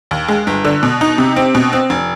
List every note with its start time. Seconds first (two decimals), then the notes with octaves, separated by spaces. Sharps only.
0.11 D#2
0.28 G#3
0.47 G1
0.65 D3
0.83 B2
1.01 D#4
1.18 C3
1.36 C4
1.55 B2
1.73 C4
1.90 F1